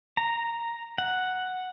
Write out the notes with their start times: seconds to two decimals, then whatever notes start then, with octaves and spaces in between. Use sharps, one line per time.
0.17 A#5
0.98 F#5